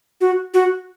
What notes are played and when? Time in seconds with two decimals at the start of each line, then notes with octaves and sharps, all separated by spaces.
0.21 F#4
0.54 F#4